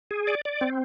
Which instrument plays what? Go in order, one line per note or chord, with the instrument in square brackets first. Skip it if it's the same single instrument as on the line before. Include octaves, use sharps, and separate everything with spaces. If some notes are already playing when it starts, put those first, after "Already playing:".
[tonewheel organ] G#4
D5
D5
C4